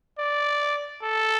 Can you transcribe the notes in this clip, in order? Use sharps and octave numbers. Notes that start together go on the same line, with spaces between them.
D5
A4